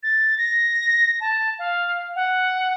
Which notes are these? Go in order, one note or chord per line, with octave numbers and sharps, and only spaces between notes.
A6
A#6
A5
F5
F#5